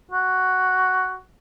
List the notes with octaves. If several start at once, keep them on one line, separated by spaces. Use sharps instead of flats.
F#4